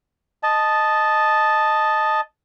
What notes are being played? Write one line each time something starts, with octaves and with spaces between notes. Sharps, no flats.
D#5 A5